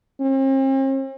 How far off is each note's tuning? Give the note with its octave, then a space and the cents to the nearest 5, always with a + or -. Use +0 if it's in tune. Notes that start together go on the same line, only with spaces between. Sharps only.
C4 +45